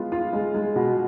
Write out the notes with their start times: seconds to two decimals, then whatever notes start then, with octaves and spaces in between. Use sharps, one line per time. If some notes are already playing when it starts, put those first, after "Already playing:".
Already playing: G#3 B3 F4
0.12 F4
0.33 G#3
0.54 G#3
0.76 B2